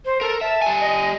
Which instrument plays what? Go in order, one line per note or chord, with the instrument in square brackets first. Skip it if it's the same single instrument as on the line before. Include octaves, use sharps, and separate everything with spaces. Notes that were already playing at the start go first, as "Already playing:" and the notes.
[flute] C5
[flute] A4 [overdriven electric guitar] A#4
[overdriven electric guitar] E5 [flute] A5
[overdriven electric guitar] G3 G#5
[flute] D#5